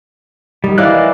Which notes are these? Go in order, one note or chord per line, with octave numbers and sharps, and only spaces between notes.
D#3 G3
E3 E4 D5 D#5 F5 F#6